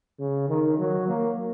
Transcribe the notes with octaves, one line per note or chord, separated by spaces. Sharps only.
C#3
D#3
F#3
A#3